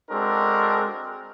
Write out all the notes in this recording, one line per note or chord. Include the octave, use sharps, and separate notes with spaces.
G#3 C4 D4 F#4 A4 A#4